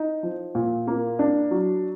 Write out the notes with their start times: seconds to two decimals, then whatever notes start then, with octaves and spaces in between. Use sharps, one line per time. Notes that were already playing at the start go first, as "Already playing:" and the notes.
Already playing: D#4
0.23 F3
0.55 A#2
0.87 A#3
1.19 D4
1.51 F#3